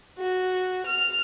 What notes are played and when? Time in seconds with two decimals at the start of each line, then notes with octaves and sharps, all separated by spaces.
0.18 F#4
0.86 F6